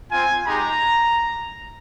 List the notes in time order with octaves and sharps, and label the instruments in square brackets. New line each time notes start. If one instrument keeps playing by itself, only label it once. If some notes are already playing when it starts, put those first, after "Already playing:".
[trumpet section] C4 F4 G#5
G#3 D#4 G4 A#5